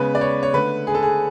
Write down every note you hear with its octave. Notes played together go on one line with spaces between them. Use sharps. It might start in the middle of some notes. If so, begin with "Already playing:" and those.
Already playing: C#3 G#3 B3 B4
D5
C#5
C#5
D3 A3 B4
G#4
A4
G#4